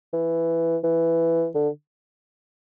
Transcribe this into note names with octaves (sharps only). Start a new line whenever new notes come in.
E3
E3
D3